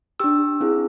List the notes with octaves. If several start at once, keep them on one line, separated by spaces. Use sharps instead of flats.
D4 G4 E6
C4 E4 G#4